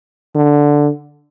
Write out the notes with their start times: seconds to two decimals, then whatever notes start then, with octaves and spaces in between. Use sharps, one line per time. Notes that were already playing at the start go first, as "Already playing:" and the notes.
0.35 D3